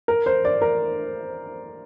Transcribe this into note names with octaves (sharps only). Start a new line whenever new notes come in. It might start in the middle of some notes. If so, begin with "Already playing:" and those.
A#4
C5
D5
A#4